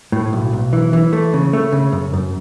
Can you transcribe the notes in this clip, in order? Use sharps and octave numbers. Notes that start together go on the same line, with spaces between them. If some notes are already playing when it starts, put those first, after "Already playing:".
A2
B1
B1
E3
E3
A3
C#3
A3
C#3
F#2
F#2